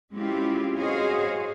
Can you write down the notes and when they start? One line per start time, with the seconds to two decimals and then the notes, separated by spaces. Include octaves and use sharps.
0.13 G#3 C4 C#4 E4 F4 G4
0.77 F#4 G#4 C5 C#5 D#5 F5